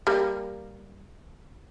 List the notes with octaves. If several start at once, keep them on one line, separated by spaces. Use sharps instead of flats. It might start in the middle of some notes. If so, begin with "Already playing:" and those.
G3 A#3